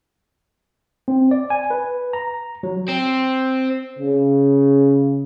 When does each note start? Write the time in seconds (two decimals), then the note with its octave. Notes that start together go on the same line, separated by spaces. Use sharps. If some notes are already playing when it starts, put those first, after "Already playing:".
1.08 C4
1.31 D5
1.50 G#5
1.70 B4
2.13 A#5
2.63 F#3
2.88 C4
3.99 C#3